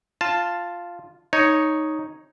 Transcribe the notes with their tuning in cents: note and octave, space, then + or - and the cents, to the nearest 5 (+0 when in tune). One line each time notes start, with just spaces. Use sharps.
F4 +0 A5 +0
D#4 +0 C#5 +0